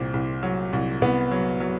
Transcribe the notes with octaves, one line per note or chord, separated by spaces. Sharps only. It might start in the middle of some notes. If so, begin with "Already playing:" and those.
Already playing: C2 A#2 C4
C2
F#3
C2
C2 B3
F#3
F#3